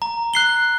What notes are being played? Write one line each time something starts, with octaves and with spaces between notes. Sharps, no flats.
A#5
F#6 C7 G7